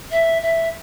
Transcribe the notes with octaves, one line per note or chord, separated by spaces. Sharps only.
E5
E5